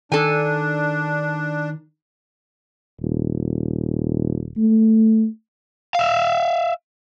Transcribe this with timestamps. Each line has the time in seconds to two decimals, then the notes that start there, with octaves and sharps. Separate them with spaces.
0.12 D#3 D4 A4 G#5
3.00 D#1
4.57 A3
5.95 E5 F5